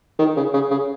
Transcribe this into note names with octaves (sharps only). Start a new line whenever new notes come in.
D#3
C#3
C#3
C#3